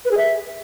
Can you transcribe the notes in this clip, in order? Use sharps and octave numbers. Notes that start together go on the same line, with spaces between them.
B4
G#4
E5